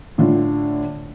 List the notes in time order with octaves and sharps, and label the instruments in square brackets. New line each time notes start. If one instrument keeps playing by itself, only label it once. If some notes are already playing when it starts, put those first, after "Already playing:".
[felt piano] A2 D3 F4